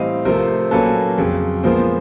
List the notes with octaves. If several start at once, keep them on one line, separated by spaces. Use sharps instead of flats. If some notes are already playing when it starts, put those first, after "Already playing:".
Already playing: A2 E3 G3 C4 D#5 F5
C3 F3 A3 C4 A#4 C5
A#2 F#3 A#3 C#4 A4 B4
F2 C#3 F#3
A#2 F3 G#3 B3 A#4 C5